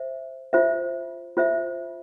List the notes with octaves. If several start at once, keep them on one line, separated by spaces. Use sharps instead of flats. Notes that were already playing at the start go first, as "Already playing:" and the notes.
Already playing: C5 E5
F4 C5 E5
F4 C5 E5